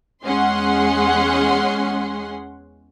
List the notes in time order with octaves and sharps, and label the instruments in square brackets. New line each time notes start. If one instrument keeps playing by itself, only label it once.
[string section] E2 G#3 C#4 G#4 F#5 C6